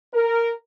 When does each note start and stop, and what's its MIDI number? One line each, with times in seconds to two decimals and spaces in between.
0.14 0.51 70